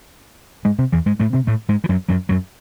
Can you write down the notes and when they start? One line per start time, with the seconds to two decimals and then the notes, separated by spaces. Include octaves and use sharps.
0.65 G#2 G#3
0.78 C3 C4
0.92 E2 E3
1.06 G#2 G#3
1.20 A2 A3
1.33 C3 C4
1.47 A2 A3
1.69 G#2 G#3
1.84 E3
1.89 F#2 F#3
2.08 F#2 F#3
2.29 F#2 F#3